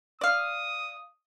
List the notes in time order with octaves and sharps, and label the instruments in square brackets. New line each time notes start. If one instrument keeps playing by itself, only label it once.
[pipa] D5 F5 [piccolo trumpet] D#6